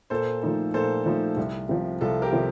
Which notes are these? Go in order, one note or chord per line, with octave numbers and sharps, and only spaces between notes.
A#2 A4 C5
F3 A3 D#4
A#2 A4 C5
F3 A3 D#4
C2
C3 F3
C2 F4 A4
G4 A#4
C3 F3